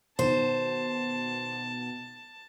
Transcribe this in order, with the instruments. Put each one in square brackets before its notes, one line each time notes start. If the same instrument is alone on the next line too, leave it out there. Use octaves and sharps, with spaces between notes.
[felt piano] B2 D#3 [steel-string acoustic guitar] C5 [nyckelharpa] A5